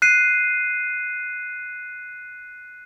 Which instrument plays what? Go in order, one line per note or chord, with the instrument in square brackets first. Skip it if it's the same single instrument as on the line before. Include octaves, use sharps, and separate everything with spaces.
[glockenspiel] F#6 C7 D#7